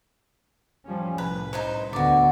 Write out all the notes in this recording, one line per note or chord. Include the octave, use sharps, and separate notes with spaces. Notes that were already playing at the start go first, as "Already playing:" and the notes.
F3 G3 C#4
C2 A2 B4
D#4 B4 C5
D2 D3 B3 F#4 D5